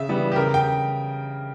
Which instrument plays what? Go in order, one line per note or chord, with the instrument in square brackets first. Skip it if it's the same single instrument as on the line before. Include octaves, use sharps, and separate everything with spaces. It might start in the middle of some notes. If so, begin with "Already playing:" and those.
Already playing: [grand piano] C#3 E5
E3 G3 B3
G4
C#3 A#4
G5